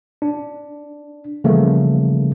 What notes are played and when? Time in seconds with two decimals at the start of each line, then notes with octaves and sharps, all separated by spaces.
0.22 D4
1.44 C#3 E3 F3 G3 A3 A#3